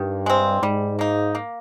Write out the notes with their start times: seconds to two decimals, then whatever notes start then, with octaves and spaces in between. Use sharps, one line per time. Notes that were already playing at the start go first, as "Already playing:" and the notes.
Already playing: G2 D#3
0.26 G#3 C4
0.62 G#2 G3
0.99 A#3 D#4
1.35 A#3